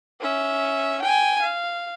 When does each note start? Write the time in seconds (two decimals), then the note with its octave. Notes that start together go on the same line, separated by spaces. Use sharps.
0.20 C#4 E5
1.02 G5 G#5
1.42 F5